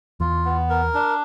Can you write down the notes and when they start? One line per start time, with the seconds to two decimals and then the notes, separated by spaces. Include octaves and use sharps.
0.20 E2 E3 F4
0.45 B3
0.70 A#4
0.94 D4